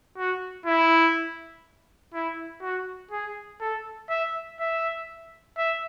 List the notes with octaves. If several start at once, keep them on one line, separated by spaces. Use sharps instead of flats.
F#4
E4
E4
F#4
G#4
A4
E5
E5
E5